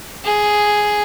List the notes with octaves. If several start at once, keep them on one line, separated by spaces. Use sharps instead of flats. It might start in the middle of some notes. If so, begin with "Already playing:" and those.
G#4